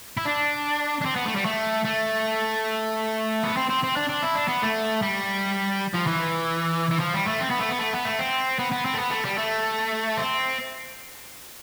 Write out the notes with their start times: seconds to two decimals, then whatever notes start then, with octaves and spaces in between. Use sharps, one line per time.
0.17 E4
0.25 D4
1.01 D4
1.05 C4
1.15 B3
1.25 A3
1.35 G3
1.45 A3
1.85 A3
3.43 B3
3.56 C4
3.69 C4
3.83 C4
3.96 D4
4.09 D4
4.23 E4
4.36 D4
4.49 B3
4.63 A3
5.02 G3
5.94 F3
6.07 E3
6.91 E3
6.99 F3
7.13 G3
7.27 A3
7.39 C4
7.50 B3
7.59 A3
7.69 B3
7.79 A3
7.93 B3
8.05 A3
8.19 C4
8.59 B3
8.72 B3
8.86 C4
8.94 A3
8.98 B3
9.11 A3
9.25 G3
9.38 A3
10.17 C4